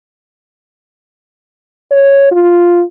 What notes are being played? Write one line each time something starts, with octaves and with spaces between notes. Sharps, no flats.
C#5
F4